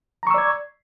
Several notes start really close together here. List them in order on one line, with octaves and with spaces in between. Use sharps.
A#5 C#6 E6 D5 G#6